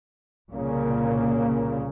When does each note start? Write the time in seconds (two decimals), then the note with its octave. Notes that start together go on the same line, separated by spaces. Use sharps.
0.50 C2 A#2 C#3 A#3